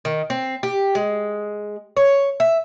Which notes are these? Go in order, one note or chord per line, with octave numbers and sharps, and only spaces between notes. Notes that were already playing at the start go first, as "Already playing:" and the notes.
D#3
C4
G4
G#3
C#5
E5